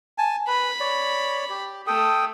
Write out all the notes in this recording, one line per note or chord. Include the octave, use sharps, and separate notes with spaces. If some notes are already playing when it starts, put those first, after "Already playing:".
G#5 A5
B4 B5
C#5 D5
G4
A3 A4 G5 D#6